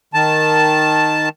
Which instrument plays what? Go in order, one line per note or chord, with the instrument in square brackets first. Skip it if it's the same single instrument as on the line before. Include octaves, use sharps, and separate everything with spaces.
[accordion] D#3 A5